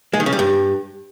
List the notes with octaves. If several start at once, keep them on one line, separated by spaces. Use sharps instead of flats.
G#3
D#3
C#3
G3
G2